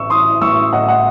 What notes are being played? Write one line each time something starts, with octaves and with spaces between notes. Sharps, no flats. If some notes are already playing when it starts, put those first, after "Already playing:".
Already playing: A1 A2 C#6 E6
E3 C6 D#6
A1 C#6 E6
A2 D#5 F#5
D#5 F#5